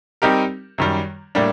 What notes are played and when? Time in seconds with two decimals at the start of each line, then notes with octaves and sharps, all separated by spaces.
0.22 G3 C4 D#4 G4 A#4
0.78 F#2 D#3 G3
1.35 A2 G3 A#3 D4